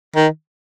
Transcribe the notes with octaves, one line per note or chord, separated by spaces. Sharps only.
D#3